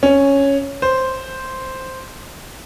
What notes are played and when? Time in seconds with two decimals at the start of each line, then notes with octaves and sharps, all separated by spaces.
0.03 C#4
0.82 C5